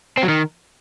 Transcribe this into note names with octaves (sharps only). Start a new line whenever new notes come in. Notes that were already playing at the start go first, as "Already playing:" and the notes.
C4
F#3
D#3